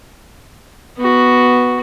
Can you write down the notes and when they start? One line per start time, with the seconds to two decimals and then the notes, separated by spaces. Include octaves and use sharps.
0.98 B3 F#4